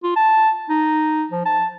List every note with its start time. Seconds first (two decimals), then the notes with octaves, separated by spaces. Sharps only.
0.04 F4
0.16 A5
0.70 D#4
1.31 F3
1.46 A5